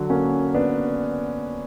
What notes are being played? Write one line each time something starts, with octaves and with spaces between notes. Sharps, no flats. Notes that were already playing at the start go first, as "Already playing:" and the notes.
Already playing: D3 F#3
A#3 C#4
B3 D4